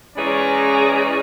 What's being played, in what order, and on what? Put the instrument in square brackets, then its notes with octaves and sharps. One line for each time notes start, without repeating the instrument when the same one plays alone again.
[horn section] E3 G#3 C#4 G#4 D5 A#5